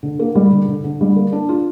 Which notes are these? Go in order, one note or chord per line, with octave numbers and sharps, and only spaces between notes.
D3
A#3
G3
D3
D3
D3
G3
A#3
D4
F4